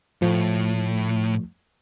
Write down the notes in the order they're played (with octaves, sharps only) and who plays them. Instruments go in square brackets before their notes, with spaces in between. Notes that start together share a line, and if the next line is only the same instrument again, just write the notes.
[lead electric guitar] A2 [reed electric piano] F3 A3